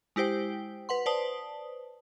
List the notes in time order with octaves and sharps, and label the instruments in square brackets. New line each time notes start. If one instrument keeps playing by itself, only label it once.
[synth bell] G#3 E4 G4 C5 G5
B4 F#5 C6
B4 C5 D5 A5 D#6